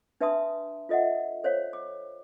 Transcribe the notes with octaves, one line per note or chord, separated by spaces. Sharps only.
D4 B4 E5 A5 C6 D#6
F4 A4 D#5 E5 F#5
A4 C5 C#5 F5
D6